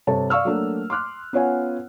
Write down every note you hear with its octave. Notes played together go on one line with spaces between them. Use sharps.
G2 C3 A4 C#5 A5
D5 F5 C#6 E6 F6
F#3 A3 A#3 D4 F#4 A#4
C6 D6 F6 F#6
B3 C#4 F4 C#5 F#5 G#5